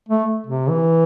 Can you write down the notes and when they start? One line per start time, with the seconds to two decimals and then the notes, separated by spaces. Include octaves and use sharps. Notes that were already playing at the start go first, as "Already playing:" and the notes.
0.09 A3
0.47 C3
0.69 E3